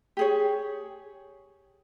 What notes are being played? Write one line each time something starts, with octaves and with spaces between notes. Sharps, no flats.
G4 G#4 C#5